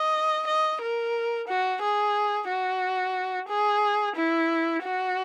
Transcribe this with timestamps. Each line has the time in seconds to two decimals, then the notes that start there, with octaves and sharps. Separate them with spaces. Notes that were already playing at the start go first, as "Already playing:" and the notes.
Already playing: D#5
0.47 D#5
0.81 A#4
1.48 F#4
1.82 G#4
2.48 F#4
3.48 G#4
4.16 E4
4.83 F#4